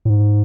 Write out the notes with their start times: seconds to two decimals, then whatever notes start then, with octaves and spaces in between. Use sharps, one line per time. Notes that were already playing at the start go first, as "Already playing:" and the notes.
0.05 A2
0.10 G#2